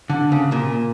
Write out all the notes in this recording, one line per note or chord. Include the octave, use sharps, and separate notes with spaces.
D3
C#3
A#2